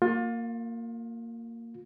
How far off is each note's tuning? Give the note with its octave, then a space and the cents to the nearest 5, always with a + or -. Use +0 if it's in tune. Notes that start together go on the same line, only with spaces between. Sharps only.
A#3 -15 F4 +30